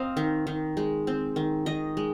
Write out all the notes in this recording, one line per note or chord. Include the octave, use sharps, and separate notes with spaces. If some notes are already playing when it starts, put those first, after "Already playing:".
Already playing: C4 A#4 D#5 F5
D#3
D#3
G#3
C4
D#3
D#3 D#5
G#3